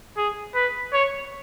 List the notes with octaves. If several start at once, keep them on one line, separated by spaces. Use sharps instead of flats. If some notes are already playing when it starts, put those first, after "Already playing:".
G#4
B4
C#5